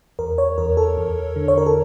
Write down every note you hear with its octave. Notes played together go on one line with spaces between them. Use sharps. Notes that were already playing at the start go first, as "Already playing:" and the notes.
E2 A#4
C#5
E2 A#4
A4
E2
D3
C#5
A#4
A4